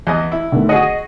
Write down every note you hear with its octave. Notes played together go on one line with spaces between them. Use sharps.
E2 D#5
E4
D3 D#3 A3
F#4 G#4 D#5 F#5